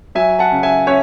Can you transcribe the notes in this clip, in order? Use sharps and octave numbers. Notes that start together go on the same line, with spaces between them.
F#3 E5 G#5
F#5 A5
C#3
E5 G#5
C#4 C#5 E5